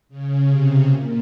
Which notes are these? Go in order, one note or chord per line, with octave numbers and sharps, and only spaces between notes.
C#3
C3
A#2